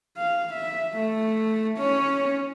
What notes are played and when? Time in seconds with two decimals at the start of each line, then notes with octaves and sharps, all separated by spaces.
0.17 F5
0.54 E5
0.95 A3
1.78 C#4 C#5